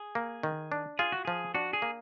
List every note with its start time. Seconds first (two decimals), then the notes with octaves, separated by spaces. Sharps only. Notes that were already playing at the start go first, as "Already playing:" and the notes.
Already playing: G#4
0.15 A#3
0.43 D#3
0.72 D4
0.99 F4 G#4
1.12 F#4
1.25 F3 G#4
1.54 D4 F#4
1.73 G#4
1.82 A#3